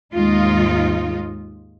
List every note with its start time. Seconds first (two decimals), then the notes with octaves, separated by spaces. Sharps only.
0.14 D#2 G#2 G#3 D#4 F4